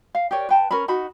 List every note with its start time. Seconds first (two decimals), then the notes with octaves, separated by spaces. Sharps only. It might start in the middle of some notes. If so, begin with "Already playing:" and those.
0.15 F5
0.31 G4 A#4 C#5 D5
0.49 B4 G5 A5
0.71 C#4 A#4 B4 B5
0.88 D#4 F#4 B5